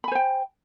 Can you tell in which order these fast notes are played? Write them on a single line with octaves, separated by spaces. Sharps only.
B5 G#5 C5 G5